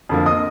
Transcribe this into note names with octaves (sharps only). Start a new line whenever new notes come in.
F2 D3 F3 A#3
D#5 D#6